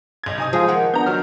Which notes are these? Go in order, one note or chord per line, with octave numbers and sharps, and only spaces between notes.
B1 G#6
C3 D#4 G#5 D#6
F3 G#3 G#4 F5
D#3 F3 A#3 F#5
B3 D4 A#5 G6
D#3 F#3 F6